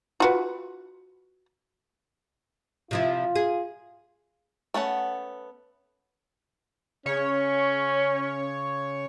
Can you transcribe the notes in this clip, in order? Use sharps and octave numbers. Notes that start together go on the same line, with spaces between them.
F4 F#4 B4
C3 F3 E4 F4
G#4
A3 B3 C#4 F#5
C#3 C#4 C#5